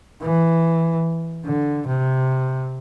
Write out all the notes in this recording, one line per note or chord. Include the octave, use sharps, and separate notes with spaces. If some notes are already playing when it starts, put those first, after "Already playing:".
E3
D3
C3